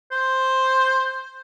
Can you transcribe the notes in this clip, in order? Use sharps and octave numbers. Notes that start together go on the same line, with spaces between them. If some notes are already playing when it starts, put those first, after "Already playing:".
C5